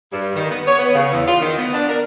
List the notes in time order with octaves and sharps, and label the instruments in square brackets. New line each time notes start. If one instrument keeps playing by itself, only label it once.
[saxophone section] G2
D#3
B3
C#5
B3
C#3
E2
F4
D#3
B3
D4
A#4